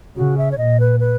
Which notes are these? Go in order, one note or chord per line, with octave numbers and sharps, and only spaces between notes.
C#3 F#4
E5
C#5
A#2 D#5
B4
B4